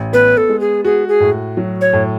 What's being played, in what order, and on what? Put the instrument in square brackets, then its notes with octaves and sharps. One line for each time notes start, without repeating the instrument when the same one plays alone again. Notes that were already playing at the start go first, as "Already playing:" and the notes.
Already playing: [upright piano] A1
[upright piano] B3 [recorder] B4
[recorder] A4
[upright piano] G#3
[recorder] G#4
[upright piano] F#4 [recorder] G#4
[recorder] G#4
[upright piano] A2
F#3
[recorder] C#5
[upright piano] A2